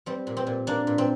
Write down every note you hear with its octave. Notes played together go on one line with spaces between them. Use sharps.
G3 C4
A#2
C4
A#2
A#3 D4
A#2
C4